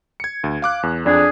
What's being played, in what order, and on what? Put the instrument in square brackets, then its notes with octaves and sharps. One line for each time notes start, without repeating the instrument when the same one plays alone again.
[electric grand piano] G#6 C#7
D2
F5 D6 F#6
E2
[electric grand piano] F2 [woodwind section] D4 G#4